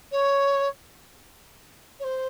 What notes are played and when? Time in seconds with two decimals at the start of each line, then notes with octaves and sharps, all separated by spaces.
0.12 C#5
2.00 C#5
2.04 C5